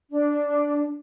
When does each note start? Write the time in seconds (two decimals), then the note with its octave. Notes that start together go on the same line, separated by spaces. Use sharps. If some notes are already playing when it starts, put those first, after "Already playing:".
0.11 D4